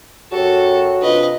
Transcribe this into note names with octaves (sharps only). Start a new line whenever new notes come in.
F#2 F#4 G4 A4 C#5
C3 D4 F4 B4 D#5